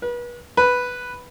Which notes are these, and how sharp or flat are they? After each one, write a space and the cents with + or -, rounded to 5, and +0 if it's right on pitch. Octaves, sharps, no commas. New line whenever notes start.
B4 -35
B4 +0